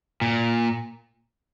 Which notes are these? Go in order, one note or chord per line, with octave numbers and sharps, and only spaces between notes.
A#2